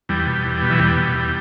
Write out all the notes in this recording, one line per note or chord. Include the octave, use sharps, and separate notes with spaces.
E2 G3
B2
E2
B2
E3
E2 G3
B2
E2